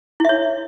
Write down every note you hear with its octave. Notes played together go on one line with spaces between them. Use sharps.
E4 C#5 E5